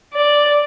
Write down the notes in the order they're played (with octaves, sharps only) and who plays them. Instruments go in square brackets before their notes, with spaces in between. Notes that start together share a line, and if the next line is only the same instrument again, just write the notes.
[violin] D5